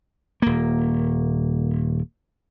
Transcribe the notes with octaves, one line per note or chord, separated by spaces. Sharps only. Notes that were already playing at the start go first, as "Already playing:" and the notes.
D#1 A#3